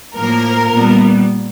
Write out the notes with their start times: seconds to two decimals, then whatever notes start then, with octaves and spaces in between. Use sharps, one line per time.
0.15 A2 F3 A#3 A#4
0.73 A#2 G3 B3